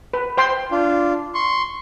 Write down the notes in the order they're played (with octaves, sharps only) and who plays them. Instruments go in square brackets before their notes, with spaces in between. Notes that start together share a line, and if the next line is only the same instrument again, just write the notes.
[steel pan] B4
C5 G5 C6
[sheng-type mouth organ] D4 F4
C6 C#6